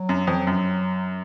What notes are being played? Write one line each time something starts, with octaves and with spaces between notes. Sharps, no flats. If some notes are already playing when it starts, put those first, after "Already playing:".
Already playing: F#3
F#2
F2
F#2